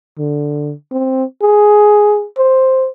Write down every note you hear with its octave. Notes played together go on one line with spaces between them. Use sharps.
D3
C4
G#4
C5